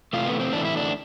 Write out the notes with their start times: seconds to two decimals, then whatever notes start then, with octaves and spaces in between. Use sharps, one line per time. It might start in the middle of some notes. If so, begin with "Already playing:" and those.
0.13 C3 E3 A3 F4
0.26 B3
0.40 C4
0.53 C3 E3 A3 D4
0.65 E4
0.77 D4